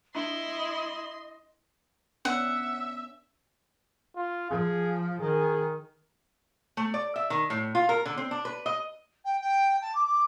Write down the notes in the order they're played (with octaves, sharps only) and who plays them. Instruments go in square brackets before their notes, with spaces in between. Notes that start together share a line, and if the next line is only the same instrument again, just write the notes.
[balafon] D4 [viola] E4 [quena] D#5 [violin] C6
[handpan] B3 C#4 D4 [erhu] E5 [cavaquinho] F#5
[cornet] F4
[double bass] F3 [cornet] G#4
[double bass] D#3 [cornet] G#4
[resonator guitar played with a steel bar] A3
D5
E5
D#3
A2
F4
A#4
D3
C4
D4
B4
D#5
[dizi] G5
G5
A5
D6
D6